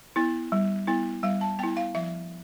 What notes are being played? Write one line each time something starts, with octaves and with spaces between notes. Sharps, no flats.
B3 E4
G3
B3 E4
G3 F5
A5
B3 E4 G5
F5
F3 E5